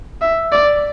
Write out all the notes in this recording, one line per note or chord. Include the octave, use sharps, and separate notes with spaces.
E5
D5